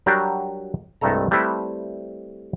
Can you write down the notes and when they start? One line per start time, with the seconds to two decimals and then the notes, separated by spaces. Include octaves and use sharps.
0.06 F#3 G3 D4 F#4 G4 A#4
1.01 C2 G2 G#3 A3 A4 A#5
1.31 G3 A3 C4 E4 B4 E5